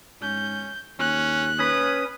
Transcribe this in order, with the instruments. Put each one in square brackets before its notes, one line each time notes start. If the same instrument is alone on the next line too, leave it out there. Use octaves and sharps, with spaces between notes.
[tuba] G#2 [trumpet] C#4 [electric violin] G6
[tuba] D#2 [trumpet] C#4 [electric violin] F#6
[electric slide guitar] C#4 B4 [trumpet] D#6